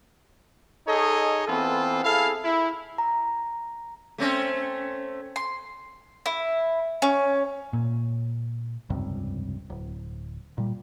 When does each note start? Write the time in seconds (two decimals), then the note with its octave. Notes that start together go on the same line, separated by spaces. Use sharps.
0.87 D#4 G#4 A4 C#5 D#5
1.48 E3 B3 C4 F4 A4
2.03 E4 G#4 A4 F5
2.44 E4
2.98 A#5
4.18 A3 C4 C#4
5.36 C6
6.26 E4
7.02 C#4
7.73 A#2
8.90 F1 C#2 G2 C3
9.70 D1
10.58 A#2 G3